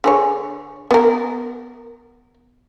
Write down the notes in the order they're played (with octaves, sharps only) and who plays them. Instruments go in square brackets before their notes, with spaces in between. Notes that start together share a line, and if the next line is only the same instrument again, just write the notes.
[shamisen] D3 G#4 C#5
B3 A#4